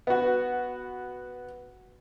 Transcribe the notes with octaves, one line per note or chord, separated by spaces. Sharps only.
B3 F#4